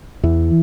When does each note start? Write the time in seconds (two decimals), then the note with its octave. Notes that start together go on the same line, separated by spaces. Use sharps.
0.23 E2 E3